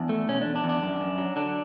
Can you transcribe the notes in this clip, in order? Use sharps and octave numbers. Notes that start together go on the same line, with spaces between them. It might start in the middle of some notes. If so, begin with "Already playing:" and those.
Already playing: E2 D4
A3
B2 C#4
E2 D4
D4
E2
D4
F#2
F#2
F#3
D3 D4